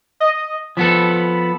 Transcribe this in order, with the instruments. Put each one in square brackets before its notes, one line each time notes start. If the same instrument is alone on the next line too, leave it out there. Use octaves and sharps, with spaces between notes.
[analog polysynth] D#5
[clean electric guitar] F3 B3 A4 [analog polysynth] B5